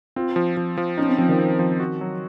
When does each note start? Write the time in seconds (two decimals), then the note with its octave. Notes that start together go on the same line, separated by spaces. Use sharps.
0.16 C4 F4
0.36 F3
0.57 F3
0.77 F3
0.97 C#4 D#4
1.08 C4
1.18 F3 C4
1.28 D#3
1.39 C4
1.59 F3
1.80 F#4
2.01 F#3